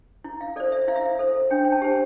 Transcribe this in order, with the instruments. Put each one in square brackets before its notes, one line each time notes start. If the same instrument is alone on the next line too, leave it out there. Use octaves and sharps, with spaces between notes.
[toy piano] E4
F5
A4 C5 D5
E5
E4 F5
E5
F5
A4 C5
D4 G5
G5
A5
G4 C5